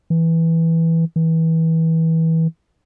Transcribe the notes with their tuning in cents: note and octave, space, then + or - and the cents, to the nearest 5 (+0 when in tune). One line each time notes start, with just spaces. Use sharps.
E3 -5
E3 -25